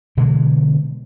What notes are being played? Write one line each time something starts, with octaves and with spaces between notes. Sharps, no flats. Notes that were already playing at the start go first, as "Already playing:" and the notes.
B2 D3 E3 G#3